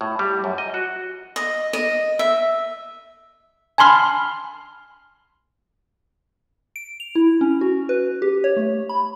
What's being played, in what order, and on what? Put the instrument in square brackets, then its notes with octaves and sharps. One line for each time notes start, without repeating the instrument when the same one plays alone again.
[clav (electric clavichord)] A2
G3
F#2
D#5
F#4
[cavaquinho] D#5
D#5
E5
[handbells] G#5 A5 B5 C6 F6
[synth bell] D7
F7
E4
C#4
F#4
B4
G4
C#5
A3
B5